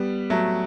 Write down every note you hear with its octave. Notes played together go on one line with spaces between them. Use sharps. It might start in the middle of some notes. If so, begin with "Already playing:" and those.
Already playing: G3 B3
F#3 A3